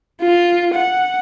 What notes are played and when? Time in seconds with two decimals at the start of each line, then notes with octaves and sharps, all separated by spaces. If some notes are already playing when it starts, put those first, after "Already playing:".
0.21 F4
0.75 F#5